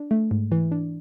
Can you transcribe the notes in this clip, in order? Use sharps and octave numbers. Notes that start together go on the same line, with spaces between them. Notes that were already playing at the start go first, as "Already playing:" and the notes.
Already playing: D4
A3
G#2
E3
D4